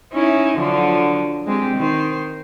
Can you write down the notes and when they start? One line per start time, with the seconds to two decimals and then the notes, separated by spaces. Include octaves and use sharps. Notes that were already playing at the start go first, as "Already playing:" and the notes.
0.13 C#4 D#4 E4
0.58 D3 F3 F#3
1.46 G#3 C4 G4
1.76 D#3 C5